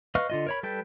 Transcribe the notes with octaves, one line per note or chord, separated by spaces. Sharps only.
B4 D#5 F5 C#6 F6
D3 F4 D#5
A#4 C#5 B5
G3 A4 B4 G5